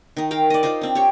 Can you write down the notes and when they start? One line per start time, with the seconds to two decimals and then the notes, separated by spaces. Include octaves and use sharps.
0.17 D#3 D#4
0.31 A#4 F5 G5
0.50 D5 D#5
0.63 D#4 F4 C5 D#5
0.81 C4 D4
0.95 G4 C#5